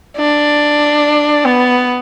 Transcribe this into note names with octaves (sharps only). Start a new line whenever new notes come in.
D4
B3